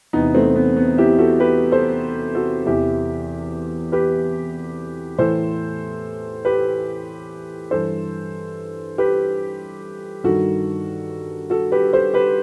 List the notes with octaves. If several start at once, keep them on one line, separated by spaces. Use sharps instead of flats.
E2 C3 E3 B3 D#4
A3 C4
B3
B3
E4 G4
F#4 A4
G4 B4
A4 C5
F#4 A4
E2 C3 E3 E4 G4
G4 B4
A2 E3 A4 C5
G4 B4
G2 E3 A4 C5
G4 B4
G2 D#3 F#4 A4
F#4 A4
G4 B4
A4 C5
G4 B4